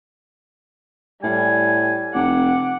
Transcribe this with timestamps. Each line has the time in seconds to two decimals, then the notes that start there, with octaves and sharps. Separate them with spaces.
1.24 A2 G3 G#5
2.14 F1 F#5 D6